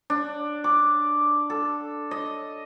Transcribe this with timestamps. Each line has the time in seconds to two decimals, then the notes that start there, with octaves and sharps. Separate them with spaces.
0.10 D4
0.64 D6
1.50 A4
2.11 D#5